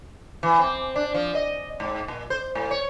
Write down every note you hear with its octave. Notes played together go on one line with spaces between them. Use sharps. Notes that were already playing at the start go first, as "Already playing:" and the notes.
E3
C4
D4
F3
D#5
G#2
A#2
C5
A2
C#5